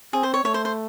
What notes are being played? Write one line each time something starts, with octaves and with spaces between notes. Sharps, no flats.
C4 G#4
C5
C#5
A3 C#5
C5
C5